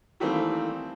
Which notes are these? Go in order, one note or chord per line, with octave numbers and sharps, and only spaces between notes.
D#3 E3 G3 A3 A#3 C4